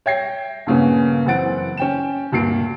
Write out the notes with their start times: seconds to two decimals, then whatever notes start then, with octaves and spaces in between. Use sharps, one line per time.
0.06 C#5 E5 G5 G#6 A#6 C7
0.67 G2 A#2 C#3 A#3 B3 C#4
1.26 F#1 E3 C4 F#5 A6 D7
1.77 C#4 G5 E7
2.32 D2 G2 A#2 C7 D7